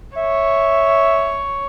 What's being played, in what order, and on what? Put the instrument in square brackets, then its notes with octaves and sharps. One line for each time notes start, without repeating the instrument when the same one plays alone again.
[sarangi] C#5 [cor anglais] E5